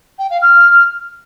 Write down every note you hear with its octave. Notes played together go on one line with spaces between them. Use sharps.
G5
F5
F6